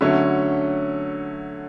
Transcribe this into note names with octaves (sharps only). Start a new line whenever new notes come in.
D3 F#3 A3 C#4